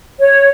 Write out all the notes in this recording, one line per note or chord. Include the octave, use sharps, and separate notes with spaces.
C#5